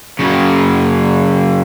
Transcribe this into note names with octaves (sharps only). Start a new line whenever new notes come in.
F#2 C#3